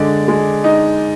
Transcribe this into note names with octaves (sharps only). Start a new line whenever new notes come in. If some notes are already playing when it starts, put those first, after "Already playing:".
Already playing: D3 G#3 D5
G#3
D#4